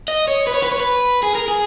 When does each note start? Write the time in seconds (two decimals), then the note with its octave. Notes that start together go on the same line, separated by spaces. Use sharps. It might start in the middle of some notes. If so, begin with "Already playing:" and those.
0.08 D#5
0.28 C#5
0.47 B4
0.54 C#5
0.63 B4
0.72 C#5
0.80 B4
1.23 G#4
1.35 A#4
1.48 G#4